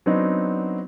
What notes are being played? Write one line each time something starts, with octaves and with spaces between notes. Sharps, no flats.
F#3 B3 C4 D4 D#4